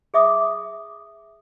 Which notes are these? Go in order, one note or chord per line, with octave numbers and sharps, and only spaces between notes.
G#4 E5 D6 D#6